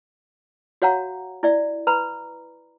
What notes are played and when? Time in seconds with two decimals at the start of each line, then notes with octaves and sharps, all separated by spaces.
0.82 F#4 C#5 F5 F#5 A#5
1.43 E4 D5 E5
1.87 B4 A#5 B5